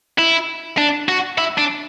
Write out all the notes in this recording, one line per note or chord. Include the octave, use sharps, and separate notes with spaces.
E4
D4
F#4
E4
D4